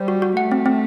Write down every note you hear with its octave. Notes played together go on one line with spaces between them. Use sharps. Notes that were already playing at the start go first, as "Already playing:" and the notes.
Already playing: G3 C5
F#4
F#4
A3 F#5
C4
C4